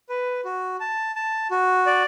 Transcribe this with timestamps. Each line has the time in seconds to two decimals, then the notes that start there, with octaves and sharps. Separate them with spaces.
0.09 B4
0.45 F#4
0.80 A5
1.16 A5
1.51 F#4
1.86 D5